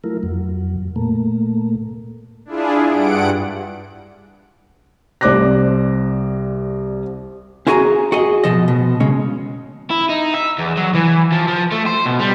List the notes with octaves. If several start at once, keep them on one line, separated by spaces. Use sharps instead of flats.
F#3 A3 E4 F4 A#4
F2 F#3
A#2 A3 A#3
D4 E4 F4 G#4
G2 F#5 D7
C2 C5 D5 D6 F#6 A#6
C#4 E4 F#4 G#4 G#5 A#5
F#4 G#4 D#5
B2 F3 D#5
B2
C#3 G#3 C#4
E4
D#4
E5
E2
F#3
E3
F3
F3
A3
C5
B2
G3